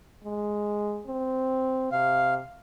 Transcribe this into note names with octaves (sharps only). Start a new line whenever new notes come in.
G#3
C4
C3 F5